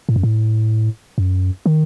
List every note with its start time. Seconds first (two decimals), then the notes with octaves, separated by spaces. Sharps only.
0.09 A2
0.16 F#2
0.23 A2
1.18 F#2
1.66 D#3